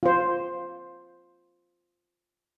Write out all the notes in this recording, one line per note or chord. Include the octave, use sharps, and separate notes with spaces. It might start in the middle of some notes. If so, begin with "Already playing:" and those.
F4 C5